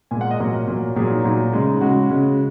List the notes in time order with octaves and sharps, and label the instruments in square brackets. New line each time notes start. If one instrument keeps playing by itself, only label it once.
[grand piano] A#2 G#3 G#5
F#5
D#5
A#2 F#3 A#4
A#2 F#3
A#2 F#3 G#4
D#4
A#2 F#3 D#4
C#3 G#3
C#3 G#3 F#4
C#3 G#3